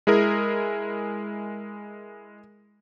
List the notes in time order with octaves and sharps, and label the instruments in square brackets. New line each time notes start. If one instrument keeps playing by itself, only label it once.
[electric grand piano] G#3 E4 G#4 A#4